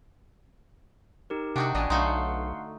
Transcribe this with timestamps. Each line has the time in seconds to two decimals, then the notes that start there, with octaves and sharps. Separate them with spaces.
1.30 D#4 G4 A#4
1.56 C3 D4 D#4 F#4 F#5 G5 C#6
1.75 A1 A#2 D4 D5 D#5 G#5
1.90 B1 D3 A3 D#4 F5 F#5 C6